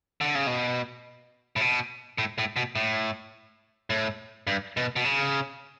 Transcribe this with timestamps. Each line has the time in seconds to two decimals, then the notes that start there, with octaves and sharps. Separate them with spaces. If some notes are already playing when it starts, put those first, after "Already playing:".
0.21 D3
0.35 C#3
0.47 B2
1.56 A2
1.61 B2
2.18 A2
2.39 A2
2.56 B2
2.75 A2
3.90 A2
4.47 G2
4.77 B2
4.96 B2
5.05 C#3